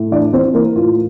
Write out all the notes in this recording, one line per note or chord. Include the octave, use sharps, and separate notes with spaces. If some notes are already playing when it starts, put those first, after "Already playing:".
Already playing: A2
E3 D4 D5
E3 C4 C5
E3 A#3 A#4
A2 F4